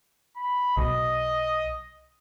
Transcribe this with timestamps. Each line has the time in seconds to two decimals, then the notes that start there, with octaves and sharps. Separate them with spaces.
0.37 B5
0.77 B1 D#5